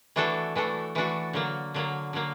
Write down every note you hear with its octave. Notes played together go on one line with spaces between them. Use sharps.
E3 A3 D4 F#4 A4
E3 A3 D4 F#4 A4
E3 A3 D4 F#4 A4
D3 F#3 A#3
D3 F#3 A#3
D3 F#3 A#3